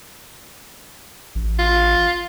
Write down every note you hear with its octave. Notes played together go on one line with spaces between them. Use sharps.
A1
F4